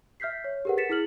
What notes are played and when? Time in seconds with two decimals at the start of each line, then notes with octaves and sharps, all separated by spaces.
0.20 E5 F6 G6 B6 C7
0.44 C#5
0.65 G4 G#4 A#4 B4 F#5
0.78 A6 B6 C#7 E7
0.89 E4 G#4 F6 F#7